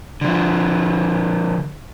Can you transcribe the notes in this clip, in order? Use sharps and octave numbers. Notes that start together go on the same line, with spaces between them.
D3 F3